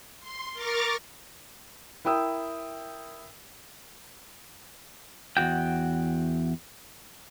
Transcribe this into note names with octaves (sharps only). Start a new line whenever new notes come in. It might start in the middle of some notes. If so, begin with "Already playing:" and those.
C6
A#4 C#6 D6 F6 A6 A#6
E4 A#4 G5 D#6 E6
E2 G2 F#4 G5